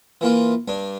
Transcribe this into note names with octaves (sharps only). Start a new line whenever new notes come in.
E3 A#3 F4
G2 D4